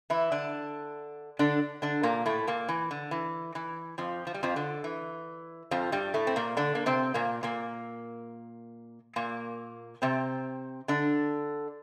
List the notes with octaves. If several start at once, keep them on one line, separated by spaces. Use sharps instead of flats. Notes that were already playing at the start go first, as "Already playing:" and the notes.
E3 E4
D3 D4
D3 D4
D3 D4
A#2 A#3
A2 A3
A#2 A#3
E3
D3
E3
E3
F2 F3
F3
G3
F2 F3
D3
E3
F2 F3
G2 G3
A2 A3
C4
A#2 A#3
D3 D4
A#3
C3 C4
A#2 A#3
A#2 A#3
A#2 A#3
C3 C4
D3 D4